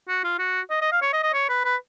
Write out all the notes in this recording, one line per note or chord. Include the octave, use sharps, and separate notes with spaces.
F#4
F4
F#4
D#5
D#5
F5
C#5
D#5
D#5
C#5
B4
B4